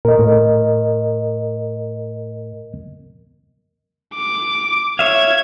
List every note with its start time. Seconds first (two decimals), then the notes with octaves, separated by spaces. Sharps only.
0.05 A#2 A#4 D#5
0.19 A2
4.15 D6
4.99 C#5 E5 F5 G#6